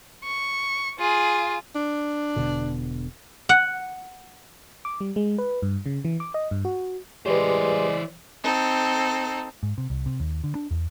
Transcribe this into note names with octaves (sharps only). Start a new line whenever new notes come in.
C#6
F4 G#4
D4
E1 B2 D3
F#5
D6
G3
G#3
B4
G2
C#3
E3
D6
D#5
G2
F#4
E3 G#3 G4 B4 C5 D5
C4 D#4 A4
G#2
C3
C2
C3
D#2
D3
D4
E2